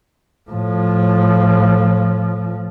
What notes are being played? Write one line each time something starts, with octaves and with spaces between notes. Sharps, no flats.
A2 F3